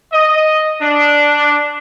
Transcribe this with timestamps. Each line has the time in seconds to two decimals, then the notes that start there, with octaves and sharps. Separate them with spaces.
0.13 D#5
0.82 D4